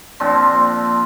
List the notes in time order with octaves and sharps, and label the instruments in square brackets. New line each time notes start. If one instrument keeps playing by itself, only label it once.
[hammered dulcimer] A#2 F3 C4 D4